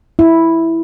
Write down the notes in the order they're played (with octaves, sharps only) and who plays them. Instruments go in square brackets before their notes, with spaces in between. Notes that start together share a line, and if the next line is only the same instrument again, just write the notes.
[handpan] E4